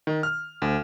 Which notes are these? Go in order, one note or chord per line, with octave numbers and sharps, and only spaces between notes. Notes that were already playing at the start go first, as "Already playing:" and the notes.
D#3
F6
D2